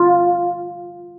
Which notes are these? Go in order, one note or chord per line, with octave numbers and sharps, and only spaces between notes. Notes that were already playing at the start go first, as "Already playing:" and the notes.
Already playing: F4